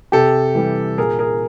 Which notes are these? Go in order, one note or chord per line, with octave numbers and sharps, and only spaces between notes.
C3 G4 A4
E3 G3
A#2 G#4 A#4
G#4 A#4